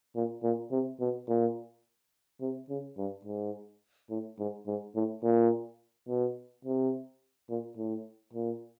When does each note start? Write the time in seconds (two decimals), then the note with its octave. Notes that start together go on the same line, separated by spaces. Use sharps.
0.16 A#2
0.43 A#2
0.71 C3
1.00 B2
1.29 A#2
2.41 C3
2.69 C#3
2.97 G2
3.25 G#2
4.10 A2
4.39 G#2
4.67 G#2
4.95 A2
5.23 A#2
6.08 B2
6.65 C3
7.49 A#2
7.77 A2
8.33 A#2